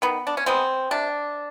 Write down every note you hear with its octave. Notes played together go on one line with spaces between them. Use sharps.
D#3 B3
D4
C#4
G#3 B3 C4
C3 D4